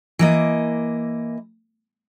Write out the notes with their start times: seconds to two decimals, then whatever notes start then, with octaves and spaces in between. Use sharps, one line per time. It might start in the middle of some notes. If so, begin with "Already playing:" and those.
0.19 E3 A#3 D#5